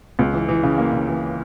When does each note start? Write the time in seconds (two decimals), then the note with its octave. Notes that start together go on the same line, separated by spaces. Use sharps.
0.19 C#2
0.34 E3
0.49 E3
0.63 C#3
0.78 A#3
0.93 C#3
1.08 E3